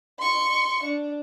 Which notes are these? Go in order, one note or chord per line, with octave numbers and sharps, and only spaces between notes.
C6 C#6
D4